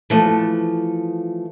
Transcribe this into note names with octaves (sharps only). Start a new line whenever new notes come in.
E3 F3 A3